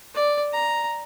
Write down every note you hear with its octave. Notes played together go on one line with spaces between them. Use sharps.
D5
A#5